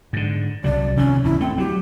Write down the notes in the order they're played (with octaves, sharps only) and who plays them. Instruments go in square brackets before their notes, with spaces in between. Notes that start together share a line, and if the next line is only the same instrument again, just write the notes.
[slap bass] G#2 D3
[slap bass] C2 C#3 F#3 [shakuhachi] D5
[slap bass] C3 D#3 F3 [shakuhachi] C#4
[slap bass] D1 E2 [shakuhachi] E4
[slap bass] A3 [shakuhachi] C4
[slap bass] F#3 [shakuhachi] G4